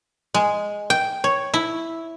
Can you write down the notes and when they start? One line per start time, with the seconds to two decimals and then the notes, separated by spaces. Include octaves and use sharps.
0.34 G#3
0.90 G5
1.24 C#5
1.54 E4